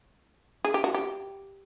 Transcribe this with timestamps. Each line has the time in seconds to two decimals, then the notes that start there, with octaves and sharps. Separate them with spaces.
0.65 G#4
0.74 G4
0.84 F#4
0.94 G4